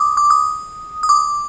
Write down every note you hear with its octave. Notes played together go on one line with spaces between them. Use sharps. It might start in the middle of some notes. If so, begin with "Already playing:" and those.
Already playing: D6 D#6
D6
D#6
D#6
D6